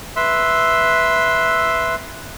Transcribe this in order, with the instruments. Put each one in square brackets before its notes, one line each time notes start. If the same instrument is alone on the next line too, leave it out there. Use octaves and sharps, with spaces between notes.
[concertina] B4 E5 C6 E6